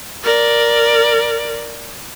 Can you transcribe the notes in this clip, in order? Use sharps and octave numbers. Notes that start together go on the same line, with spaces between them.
A#4 D5